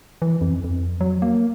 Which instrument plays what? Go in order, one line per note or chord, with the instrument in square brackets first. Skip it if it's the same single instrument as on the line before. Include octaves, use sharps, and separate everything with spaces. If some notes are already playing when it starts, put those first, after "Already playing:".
[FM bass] E3
F2
F2
F#3
A#3